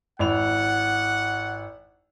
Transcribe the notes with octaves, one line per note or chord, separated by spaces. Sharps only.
G#1 E4 F#5 F7